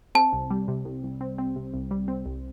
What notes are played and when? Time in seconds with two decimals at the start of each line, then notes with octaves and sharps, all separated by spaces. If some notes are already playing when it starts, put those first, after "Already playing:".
0.15 C4 A5
0.33 C2
0.50 G3
0.68 C3
0.85 C2
1.03 C2
1.21 C4
1.38 C4
1.56 C3
1.74 C2
1.91 G3
2.08 C4
2.26 C2